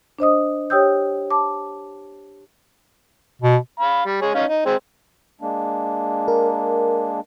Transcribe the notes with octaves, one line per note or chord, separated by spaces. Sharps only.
D4 C5 D#5 D#6
G4 C#5 G5 D#6 E6 G6
A5 D6
B2
F5 B5
G3
G#3 G#4 C#5
C#4 D#4 F5
D#4
G#3 C4
G#3 A#3 D4
A#4